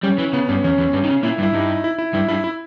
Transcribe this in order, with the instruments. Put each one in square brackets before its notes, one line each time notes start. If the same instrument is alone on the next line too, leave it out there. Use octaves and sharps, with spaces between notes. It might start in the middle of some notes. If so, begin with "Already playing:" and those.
[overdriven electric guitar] G3 [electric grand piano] C#4
[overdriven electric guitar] E3
[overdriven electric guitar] C#3 [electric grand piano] B3
[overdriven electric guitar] G2 [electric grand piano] C#4
[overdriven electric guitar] E2 [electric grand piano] C#4
[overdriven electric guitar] E2
G2
D#3
C#3
[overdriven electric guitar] A#2 [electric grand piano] E4
[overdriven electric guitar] G2
[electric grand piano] E4
[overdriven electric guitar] G2 [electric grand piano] D#4
[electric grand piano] E4
E4
[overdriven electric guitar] G2 [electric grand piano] E4
[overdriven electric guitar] G2 [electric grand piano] E4
[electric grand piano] E4